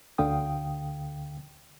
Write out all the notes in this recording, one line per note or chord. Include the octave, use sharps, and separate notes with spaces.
D2 D3 F5 G5 D#6